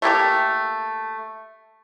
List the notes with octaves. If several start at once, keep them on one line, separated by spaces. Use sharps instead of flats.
A3 A#3 G4 A4